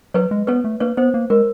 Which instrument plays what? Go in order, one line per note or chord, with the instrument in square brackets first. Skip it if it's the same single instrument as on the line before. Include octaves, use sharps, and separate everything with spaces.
[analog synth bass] F#3 [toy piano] B4 C#5
[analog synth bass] G#3
[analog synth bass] B3 [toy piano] B4 C#5
[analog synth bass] A3
[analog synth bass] A#3 [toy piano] B4 C#5
[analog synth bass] B3 [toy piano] C5
[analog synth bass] A#3
[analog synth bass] G#3 [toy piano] A#4